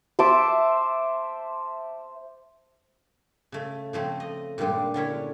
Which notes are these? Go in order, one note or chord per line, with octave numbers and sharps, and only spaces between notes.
C5 E5 A5 D6
C#3 A3
C#3 F3 A3 C4
D#5
G2 A#2 D#3 G3 G#3
D3 C#4 E4 C#5